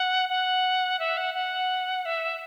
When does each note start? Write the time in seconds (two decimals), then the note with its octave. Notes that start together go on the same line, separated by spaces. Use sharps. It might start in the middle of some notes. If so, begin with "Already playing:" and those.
Already playing: F#5
0.29 F#5
0.99 E5
1.17 F#5
1.34 F#5
2.05 E5